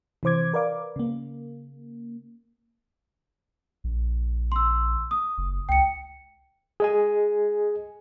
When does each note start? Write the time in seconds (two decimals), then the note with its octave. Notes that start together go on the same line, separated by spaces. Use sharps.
0.23 C3 E3 C5 D6 G#6
0.54 A#4 B4 D5 F5 D6
0.96 C#3 A#3
3.84 A#1
4.52 C6 E6
5.11 D#6
5.38 F#1
5.69 C#2 G5 C#7
6.80 G#4 D#5 G#5